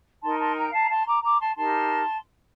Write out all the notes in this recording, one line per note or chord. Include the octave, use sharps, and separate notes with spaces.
D#4 A#4 A5 C6
A5 C6
G5 A#5
F5 A5
A#5
A5 C6
A#5 D6
A#5 D6
A5 C6
D#4 G4 A#4 A5 C6